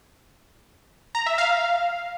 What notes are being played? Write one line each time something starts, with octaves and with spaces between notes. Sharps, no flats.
A#5
E5
F5